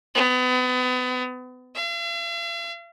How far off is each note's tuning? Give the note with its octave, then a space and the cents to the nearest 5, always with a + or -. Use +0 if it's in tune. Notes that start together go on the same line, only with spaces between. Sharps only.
B3 +35
F5 -45